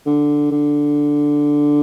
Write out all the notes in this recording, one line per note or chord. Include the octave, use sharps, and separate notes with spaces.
D3
D3